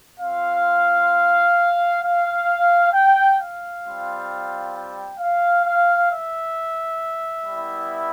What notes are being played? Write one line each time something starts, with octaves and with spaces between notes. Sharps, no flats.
C4 F4 F5
F5
G5
F5
G3 C4 F4
G5
F5
F5
E5
G3 B3 E4